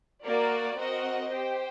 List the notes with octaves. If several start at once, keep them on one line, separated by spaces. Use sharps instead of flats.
A#3 F#4 A#4 D5
C4 F#4 A#4 D#5 F#5
G4 C5 G5